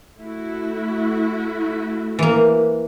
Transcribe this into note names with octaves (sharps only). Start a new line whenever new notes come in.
A3 E4 F#4
E3 A#3